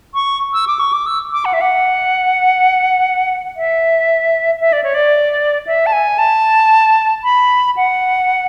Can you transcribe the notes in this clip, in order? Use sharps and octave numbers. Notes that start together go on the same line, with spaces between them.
C#6
E6
D6
C#6
D6
E6
D6
F#5
E5
F#5
E5
E5
D5
C#5
D5
E5
A5
G#5
A5
B5
F#5